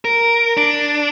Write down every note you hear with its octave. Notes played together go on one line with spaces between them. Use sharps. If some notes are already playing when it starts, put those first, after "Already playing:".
A#4
D4